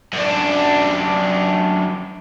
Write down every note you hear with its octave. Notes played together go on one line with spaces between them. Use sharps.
F#2 D4